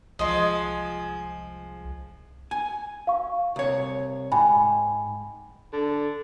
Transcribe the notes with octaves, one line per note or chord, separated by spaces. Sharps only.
C2 F3 G#3 D#5 C6
G#5
F5 C#6
C2 C#5
G#2 G5 G#5 B5
D3